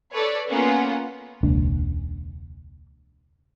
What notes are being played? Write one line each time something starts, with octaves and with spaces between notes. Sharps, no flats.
A4 B4 C#5 D5
A#3 B3 C#4 F4 F#5
E1 C#2 A#3 D4